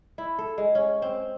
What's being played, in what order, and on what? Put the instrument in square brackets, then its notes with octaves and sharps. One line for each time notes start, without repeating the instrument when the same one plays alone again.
[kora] E4
A4
G#3
C#4
C4